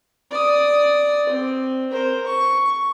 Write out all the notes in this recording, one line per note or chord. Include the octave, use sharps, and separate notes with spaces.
D5 D#6
C4
A#4 C5
C#6